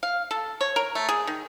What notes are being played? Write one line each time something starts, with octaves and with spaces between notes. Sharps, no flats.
F5
A4
C#5
A#4
A3
G#4
D#3